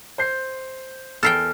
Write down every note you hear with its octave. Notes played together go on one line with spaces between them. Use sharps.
C5 G6 C7
E2 A4 A#4 G5 F6 C7